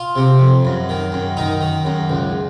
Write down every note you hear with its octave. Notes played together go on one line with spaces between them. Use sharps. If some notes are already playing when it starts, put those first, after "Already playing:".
Already playing: F4
C3
F2
F#2
D#3
F#2
D#3 D#4
D#3
F#2
C#2